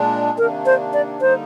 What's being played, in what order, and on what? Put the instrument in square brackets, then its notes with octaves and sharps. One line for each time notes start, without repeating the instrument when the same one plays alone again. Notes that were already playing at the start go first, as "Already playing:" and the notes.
Already playing: [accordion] A#2 G#3 D4
[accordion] C3 D#3 A#3 D4 [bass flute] A#4
[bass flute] C5
D5
[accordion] D3 G3 A#3 D#4 [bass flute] C5